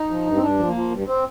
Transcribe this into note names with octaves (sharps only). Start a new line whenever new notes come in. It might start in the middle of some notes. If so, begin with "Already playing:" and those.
Already playing: D#4
F3
G2
C4
G2 D4
F3
A#3
F3
G2
C4